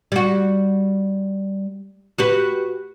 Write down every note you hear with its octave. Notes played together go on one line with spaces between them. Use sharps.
G3 F#4
F#4 G4 B4